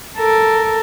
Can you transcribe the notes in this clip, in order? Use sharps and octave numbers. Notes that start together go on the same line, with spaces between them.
A4 A#4